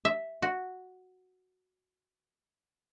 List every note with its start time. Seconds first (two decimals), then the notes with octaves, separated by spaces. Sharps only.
0.05 E5
0.42 F#4